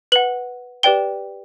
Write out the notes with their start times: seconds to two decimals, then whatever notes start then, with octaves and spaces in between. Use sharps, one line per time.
0.12 B4 F#5 F#7
0.83 G4 B4 D5 G5 G7